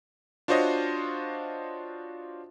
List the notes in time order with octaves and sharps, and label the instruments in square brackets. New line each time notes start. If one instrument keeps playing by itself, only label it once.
[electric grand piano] D4 F4 F#4 C5 C#5 D#5